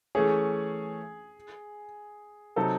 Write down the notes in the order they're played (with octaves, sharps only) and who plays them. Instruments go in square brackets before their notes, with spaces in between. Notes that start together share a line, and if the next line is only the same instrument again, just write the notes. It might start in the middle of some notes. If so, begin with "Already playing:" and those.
[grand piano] E3 A3 C#4 [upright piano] G#4
[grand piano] C3 F#3 C4 D#4 [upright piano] A4